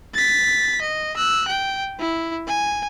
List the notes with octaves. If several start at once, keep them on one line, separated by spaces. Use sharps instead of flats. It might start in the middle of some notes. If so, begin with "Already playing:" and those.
A6 B6
D#5
E6 F#6
G5
E4
G#5